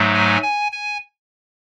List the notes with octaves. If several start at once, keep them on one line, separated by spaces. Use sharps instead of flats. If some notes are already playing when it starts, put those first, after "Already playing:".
Already playing: G#2 F#3 A3
G#5
G#5
G#5